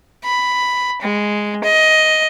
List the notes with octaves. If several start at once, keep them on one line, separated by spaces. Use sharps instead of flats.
B5
G#3
D#5